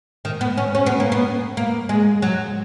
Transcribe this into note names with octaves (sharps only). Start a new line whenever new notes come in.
D#3
B3
C#4
C#4
B3
A#3
B3
A#3
G#3
F#3